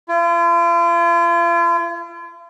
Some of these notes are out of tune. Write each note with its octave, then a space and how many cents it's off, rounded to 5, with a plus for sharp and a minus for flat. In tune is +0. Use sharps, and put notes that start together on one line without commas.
F4 -45